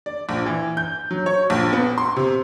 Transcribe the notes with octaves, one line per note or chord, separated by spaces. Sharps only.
D5
A#1
E3
G6
F#3
C#5
A#1
B3
C6
C3